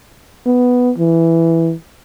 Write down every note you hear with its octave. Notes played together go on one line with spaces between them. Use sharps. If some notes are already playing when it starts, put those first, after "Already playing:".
B3
E3